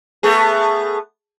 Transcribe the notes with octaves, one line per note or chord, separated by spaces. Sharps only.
A3 B3 G#4